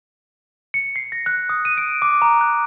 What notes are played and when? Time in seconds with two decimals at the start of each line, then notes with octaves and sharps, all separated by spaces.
0.74 C#7
0.96 C7
1.12 A#6
1.26 F#6
1.49 D#6
1.65 D#7
1.77 D7
2.02 D6
2.22 A#5
2.41 F#6